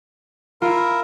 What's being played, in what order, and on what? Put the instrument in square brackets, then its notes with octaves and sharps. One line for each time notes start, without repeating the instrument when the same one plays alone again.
[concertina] E4 A#4 [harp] F4